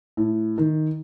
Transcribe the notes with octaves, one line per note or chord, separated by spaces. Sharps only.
A2
D#3